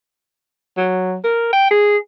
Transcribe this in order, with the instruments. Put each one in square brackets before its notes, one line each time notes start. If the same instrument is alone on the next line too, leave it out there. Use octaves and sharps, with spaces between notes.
[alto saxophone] F#3
A#4
G5
G#4